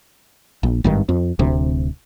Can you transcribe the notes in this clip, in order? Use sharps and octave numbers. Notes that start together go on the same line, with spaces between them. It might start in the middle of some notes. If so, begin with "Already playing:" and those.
A#1
G#1 G2 D#3
F2
D1 D2 C3